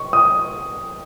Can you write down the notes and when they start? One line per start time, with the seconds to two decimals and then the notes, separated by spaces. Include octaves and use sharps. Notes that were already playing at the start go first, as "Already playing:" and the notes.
Already playing: C#6
0.13 D#6